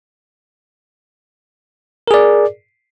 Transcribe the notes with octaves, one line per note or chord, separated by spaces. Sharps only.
G#4 A#4 D5